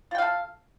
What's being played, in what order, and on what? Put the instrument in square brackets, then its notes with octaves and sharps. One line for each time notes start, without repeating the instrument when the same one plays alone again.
[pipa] F4
G5
F5
A4